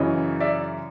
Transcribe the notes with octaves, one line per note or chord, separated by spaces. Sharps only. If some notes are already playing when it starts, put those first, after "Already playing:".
Already playing: F#2 C#3 E3 C#5 D#5
D5 E5